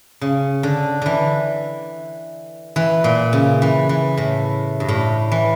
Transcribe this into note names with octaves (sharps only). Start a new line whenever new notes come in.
C#3
D3
D3 E3
E3
A#2
C#3
E3
E3
A2
G2
A2
E3